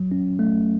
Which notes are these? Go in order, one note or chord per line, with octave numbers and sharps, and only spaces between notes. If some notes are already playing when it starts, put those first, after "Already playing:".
Already playing: F#3
C#4
A3